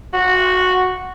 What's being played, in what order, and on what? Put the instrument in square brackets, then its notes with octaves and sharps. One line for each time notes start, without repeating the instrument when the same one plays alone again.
[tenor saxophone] F#4